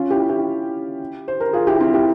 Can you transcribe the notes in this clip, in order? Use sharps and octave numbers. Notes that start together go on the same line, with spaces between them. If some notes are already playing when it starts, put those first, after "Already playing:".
Already playing: C#4 F4
E4 G4
E4 G4
C5
A#4
F4 G#4
E4 G4
C4 E4
E4 G4